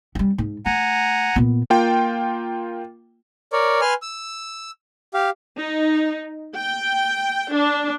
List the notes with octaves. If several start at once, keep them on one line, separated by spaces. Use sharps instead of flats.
G3 C#4
G#2
A3 F#5 G#5 A#5
A#2 B3
A#3 F4 G5
A#4 C#5 D5
B4 G#5 C6 F6
E6
G4 F5
D#4
G5
D4